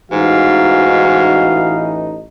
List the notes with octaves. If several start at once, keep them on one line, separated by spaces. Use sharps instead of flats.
A1 G#2 E3 D#4 F#4 F5